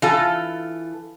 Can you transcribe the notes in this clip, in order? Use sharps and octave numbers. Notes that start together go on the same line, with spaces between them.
E3 F4 A4